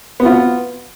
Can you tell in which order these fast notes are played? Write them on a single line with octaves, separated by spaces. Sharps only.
B3 F#4 F4